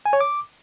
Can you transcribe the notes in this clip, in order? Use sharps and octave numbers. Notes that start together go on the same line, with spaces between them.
G#5
C#5
D6